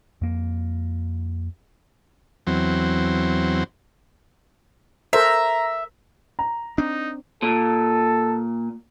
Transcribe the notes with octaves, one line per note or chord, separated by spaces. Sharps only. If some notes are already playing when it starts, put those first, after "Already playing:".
F2 A#3
E2 F#3 C4
A4 A#4 C5 E5 A#5
A#5
C4 D4 D#4
A#2 A4